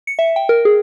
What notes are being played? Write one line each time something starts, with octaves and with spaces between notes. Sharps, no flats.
C#7
E5
G5
A#4
G#4